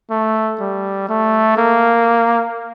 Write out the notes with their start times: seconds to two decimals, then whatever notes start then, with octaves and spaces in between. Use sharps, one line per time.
0.11 A3
0.61 G3
1.09 A3
1.58 A#3